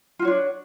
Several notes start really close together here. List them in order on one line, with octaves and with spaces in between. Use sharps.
F4 F#4 C#5 D4